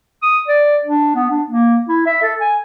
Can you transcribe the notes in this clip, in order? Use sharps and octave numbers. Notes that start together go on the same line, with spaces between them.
D#6
D5
D4
B3
D4
A#3
E4
E5
A4
G#5